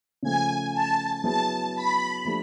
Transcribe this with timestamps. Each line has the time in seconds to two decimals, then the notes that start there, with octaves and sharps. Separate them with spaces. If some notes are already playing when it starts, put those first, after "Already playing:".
0.23 C#3 F3 A3 G#5
0.74 A5
1.24 F#3 B3 E4 G#4 A5
1.75 B5
2.25 F3 A3 D4 G4